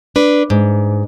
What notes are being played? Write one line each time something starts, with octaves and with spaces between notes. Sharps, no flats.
D4 B4
G#2